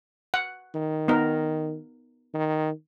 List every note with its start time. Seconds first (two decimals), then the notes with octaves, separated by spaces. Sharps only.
0.34 F#5
0.75 D#3
1.08 B3 D#4 A#4
2.34 D#3